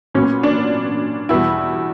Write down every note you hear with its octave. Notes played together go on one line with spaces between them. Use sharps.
A#2 F#3 B3 C#4
D4
E2 B2 G3 E4